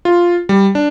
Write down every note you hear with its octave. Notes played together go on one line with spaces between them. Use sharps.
F4
G3
D4